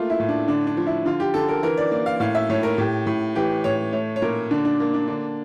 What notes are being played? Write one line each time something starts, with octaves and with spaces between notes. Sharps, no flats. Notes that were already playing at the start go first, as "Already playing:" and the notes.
Already playing: A3 A#3 F4
E4
A2
D4
D3 D4
D4
F3
E4
D3 F4
G4
D3 A4
A#4
E3 A#4
D5
A#3 D5
F5
A2 F5
E5
A2 C#5
A#4
A2 G4
A2
E3 G4
A2 C#5
A3 C#5
C#5
A#2 A#4
D3 D4
D4
A#3
D4
D3 D4